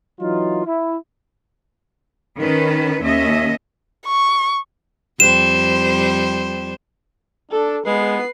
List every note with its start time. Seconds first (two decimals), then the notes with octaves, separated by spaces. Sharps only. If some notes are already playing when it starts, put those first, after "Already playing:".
0.21 E3 F#3 D#4 F4
0.66 E4
2.39 D#3 C#4 B4
3.02 D#2 C#4 D#5 E5
4.07 C#6
5.20 F2 G3 C5 E7
7.51 D4 A4
7.86 G#3 B3 B4 C7